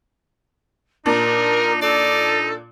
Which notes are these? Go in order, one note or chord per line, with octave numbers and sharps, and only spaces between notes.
A#2 D4 D#4 A#4
D#4 A4 D5